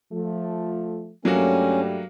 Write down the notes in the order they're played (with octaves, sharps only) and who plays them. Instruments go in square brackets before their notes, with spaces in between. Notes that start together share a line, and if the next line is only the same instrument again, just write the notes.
[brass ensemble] F3 A3
[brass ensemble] G2 G3 A3 [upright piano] F#3 A#3 F#4 [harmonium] C#4